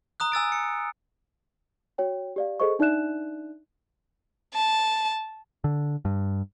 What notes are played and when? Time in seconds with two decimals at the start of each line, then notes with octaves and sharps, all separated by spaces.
0.20 A#5 D#6 F#6
0.32 G#5 E6 A6 D7
0.52 C#7
1.98 F#4 C#5 G5
2.36 G4 D5 F5
2.60 G#4 A4 C5 D#5 C#6
2.79 D4 D#4 D5 E5 F#6 E7
4.54 A5
5.64 D3
6.05 G2